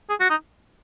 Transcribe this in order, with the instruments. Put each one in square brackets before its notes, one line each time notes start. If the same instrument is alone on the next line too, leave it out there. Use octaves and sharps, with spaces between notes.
[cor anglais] G#4
F#4
D#4